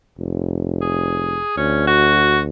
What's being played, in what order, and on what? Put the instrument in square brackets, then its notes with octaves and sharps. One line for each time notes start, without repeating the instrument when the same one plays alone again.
[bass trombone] F1
[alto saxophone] G#4
[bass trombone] D2 [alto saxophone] C#4
[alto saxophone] F#4